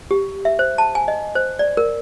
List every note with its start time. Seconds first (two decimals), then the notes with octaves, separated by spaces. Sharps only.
0.11 G4
0.45 E5
0.59 C5
0.78 A5
0.95 G#5
1.08 D#5
1.35 C5
1.59 D5
1.77 A#4